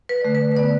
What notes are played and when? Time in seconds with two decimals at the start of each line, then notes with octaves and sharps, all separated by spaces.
0.09 B4
0.21 D3 A3 D5
0.35 B4
0.51 B4
0.57 D3 B3 D5